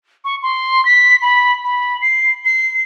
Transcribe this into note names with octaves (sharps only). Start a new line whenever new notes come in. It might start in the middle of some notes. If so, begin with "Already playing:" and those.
C#6
C6
B6
B5
B5
C7
C7